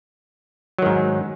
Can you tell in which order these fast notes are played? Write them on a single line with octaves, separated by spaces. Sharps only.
F#3 D#3 G#2